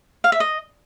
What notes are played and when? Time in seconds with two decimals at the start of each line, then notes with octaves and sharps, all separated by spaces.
0.24 F5
0.32 E5
0.40 D#5